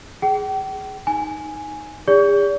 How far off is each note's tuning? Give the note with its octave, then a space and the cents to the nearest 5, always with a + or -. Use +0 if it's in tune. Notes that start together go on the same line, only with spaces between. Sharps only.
G#4 +0 G5 -40
D#4 +0 G#5 +0
D#4 -10 G#4 -45 D5 -40